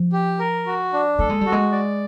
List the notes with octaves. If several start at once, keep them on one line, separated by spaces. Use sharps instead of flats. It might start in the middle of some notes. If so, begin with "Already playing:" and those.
Already playing: F3
G4
A#4
F#4
D4
A3 A4
G#3
G3 F#4
G#3
D5